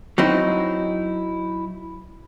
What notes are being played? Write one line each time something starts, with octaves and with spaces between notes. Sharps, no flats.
F#3 C4 D#4 E4